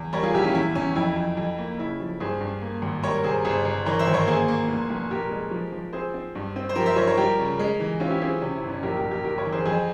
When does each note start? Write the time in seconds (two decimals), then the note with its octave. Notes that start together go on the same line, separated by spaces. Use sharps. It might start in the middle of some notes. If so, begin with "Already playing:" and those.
Already playing: E2
0.13 G3 A#4 C#5
0.23 F4 G#4
0.34 A#1 E4 G4
0.44 C#4 F4
0.55 E2 E4
0.75 E2 C#4
0.96 F2 E4
1.16 F2
1.37 F2
1.58 A#3
1.78 C#3 E4
2.00 F3
2.20 G2 G#4 C5
2.40 G2
2.61 A#3
2.82 G#1
3.03 G3 A#4 C#5
3.14 A#4
3.23 C3 G#4 C5
3.45 G1 G#4 C5
3.65 G1
3.85 E3 A#4 C#5
3.99 C5 E5
4.07 G#1
4.14 A#4 C#5
4.27 A#3 G#4 C5
4.48 A#3
4.68 F1
4.90 F1
5.10 A#2 G4 A#4
5.31 G#3
5.51 F3
5.72 F3
5.93 C4 G#4 C5
6.14 C4
6.35 G2
6.56 C4
6.69 C5
6.75 F3 G4 A#4
6.86 C5 E5
6.96 F3 A#4 C#5
7.07 A#4 C#5
7.17 G3 G4 A#4
7.39 C#3
7.59 G#3
7.80 E3
8.00 C4 C#4 F4
8.10 E4 G4
8.20 C4 F4 G#4
8.42 C3 C#4
8.56 E4
8.63 G1
8.70 C#4
8.83 A#1 G4 A#4
8.96 G4 A#4
9.05 A#1
9.11 G4 A#4
9.24 G1 G4 A#4
9.38 A#4 C#5
9.45 E3
9.52 G#4 C5
9.65 F2 G#4 C5